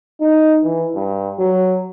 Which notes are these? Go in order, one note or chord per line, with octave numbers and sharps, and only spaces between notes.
D#4
E3
G2
F#3